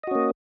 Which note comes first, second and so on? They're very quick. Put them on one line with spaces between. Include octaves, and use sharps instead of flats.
D#5 F#4 C#4 A#3